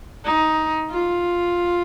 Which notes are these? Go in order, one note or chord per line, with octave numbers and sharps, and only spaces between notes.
D#4
F4